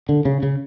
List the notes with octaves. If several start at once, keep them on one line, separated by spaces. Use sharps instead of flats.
D3
C#3
C#3